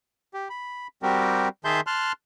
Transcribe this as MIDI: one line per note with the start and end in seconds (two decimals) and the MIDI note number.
0.34 0.48 67
0.50 0.87 83
1.03 1.48 55
1.03 1.48 60
1.03 1.48 66
1.03 1.48 67
1.03 1.48 70
1.65 1.81 51
1.65 1.81 68
1.65 1.81 76
1.65 1.81 81
1.65 1.81 84
1.65 1.81 91
1.87 2.12 81
1.87 2.12 84
1.87 2.12 89
1.87 2.12 90